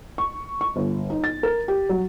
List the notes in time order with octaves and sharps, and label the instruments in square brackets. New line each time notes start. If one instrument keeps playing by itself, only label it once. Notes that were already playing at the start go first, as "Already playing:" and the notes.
[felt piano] C#6
C#6
G1
D#4
A6
A#4
G4
F#3